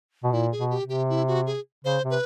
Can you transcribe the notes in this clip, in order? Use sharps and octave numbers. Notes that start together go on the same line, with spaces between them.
B2
A#2 E4
G#4
B2
G4
C3
G4
E4
F#4
G#4
C#3 C5
C3
B4